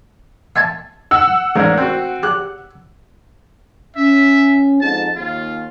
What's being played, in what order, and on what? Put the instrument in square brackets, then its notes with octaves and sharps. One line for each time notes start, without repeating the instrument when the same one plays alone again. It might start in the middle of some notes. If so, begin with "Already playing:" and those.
[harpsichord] E5 G#5 A5
[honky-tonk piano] F#5 E6
[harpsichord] A1 [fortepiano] E2 G#2 A#4
[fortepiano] C4 F#4
[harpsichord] G4 [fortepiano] F#6
[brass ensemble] C#4 [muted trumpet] E5
[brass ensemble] F2 G#2 [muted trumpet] A5
[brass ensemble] D#2 [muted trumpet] F4